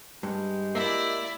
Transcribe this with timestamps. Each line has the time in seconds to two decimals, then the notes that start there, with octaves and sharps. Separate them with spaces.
0.23 G2 G#3 G4
0.75 A#3 E4 D5 E5